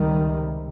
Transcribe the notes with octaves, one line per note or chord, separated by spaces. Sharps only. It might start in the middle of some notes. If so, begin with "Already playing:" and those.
Already playing: C#2 C3 D#3 G3